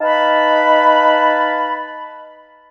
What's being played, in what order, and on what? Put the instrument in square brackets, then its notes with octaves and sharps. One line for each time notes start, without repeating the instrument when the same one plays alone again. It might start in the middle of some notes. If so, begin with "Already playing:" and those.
[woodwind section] D#4 B4 F5 A5 B5